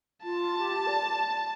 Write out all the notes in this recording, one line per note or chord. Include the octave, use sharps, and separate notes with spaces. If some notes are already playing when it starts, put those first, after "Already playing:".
F4 A5
G4
D5